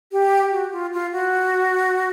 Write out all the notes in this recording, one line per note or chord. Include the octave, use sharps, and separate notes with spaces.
G4
F#4
F4
F4
F#4